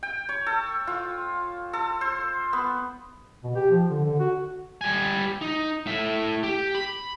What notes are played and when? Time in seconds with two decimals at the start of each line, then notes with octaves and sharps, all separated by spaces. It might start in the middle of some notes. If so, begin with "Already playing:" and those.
0.03 G5
0.29 C#5
0.47 A4
0.87 F4
1.73 A4
2.01 C5
2.53 B3
3.43 B2
3.55 G4
3.71 F3
3.90 D3
4.05 D3
4.20 F#4
4.81 G3 G#5
5.41 D#4
5.86 A2 E5
6.43 G4
6.75 B5